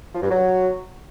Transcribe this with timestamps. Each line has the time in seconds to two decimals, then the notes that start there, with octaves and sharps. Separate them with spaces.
0.15 F3
0.22 G2
0.29 F#3